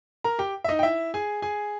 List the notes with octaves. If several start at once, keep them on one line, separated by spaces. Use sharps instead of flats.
A#4 A#5
G4 G5
E5
D#4 D#5
G5
E4 E5
G#4 G#5
G#4 G#5